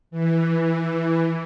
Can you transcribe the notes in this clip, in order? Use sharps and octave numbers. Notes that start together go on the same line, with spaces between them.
E3